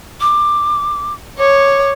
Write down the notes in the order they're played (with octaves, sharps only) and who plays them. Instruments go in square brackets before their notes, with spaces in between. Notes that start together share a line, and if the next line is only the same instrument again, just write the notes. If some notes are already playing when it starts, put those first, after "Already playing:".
[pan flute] D6
[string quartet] C#5 [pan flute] D6